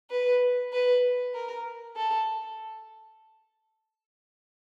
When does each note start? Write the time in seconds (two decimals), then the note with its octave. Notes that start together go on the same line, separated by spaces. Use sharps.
0.11 B4
0.73 B4
1.34 A#4
1.96 A4